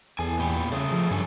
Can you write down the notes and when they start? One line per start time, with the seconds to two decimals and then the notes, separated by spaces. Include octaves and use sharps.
0.19 E2 A4 G#5
0.39 A#2 B3 G4
0.72 C#3 A3 G#4
0.92 F3
1.11 G2 C#3 A4 G#5